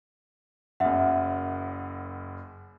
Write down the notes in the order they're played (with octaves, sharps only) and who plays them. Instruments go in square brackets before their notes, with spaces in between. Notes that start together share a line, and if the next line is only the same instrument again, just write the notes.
[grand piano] F#1 F#2 [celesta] E5 F#5